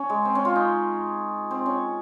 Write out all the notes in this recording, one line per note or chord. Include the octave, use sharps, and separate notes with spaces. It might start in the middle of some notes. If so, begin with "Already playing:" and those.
Already playing: C#4
G#3
C4
C#4
F4
D#4
C4
C#4